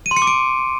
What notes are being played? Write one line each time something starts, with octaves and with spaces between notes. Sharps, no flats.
D#7
C6
C#7
D6
D7